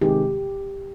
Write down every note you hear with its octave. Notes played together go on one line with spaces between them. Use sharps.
C3 D#3 G#3 G4